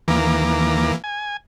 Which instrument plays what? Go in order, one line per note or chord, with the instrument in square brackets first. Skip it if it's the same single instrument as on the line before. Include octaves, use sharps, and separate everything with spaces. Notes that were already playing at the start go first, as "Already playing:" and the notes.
[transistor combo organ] D#2 A#5 D6 [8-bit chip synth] E3 A#3
[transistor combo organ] G#5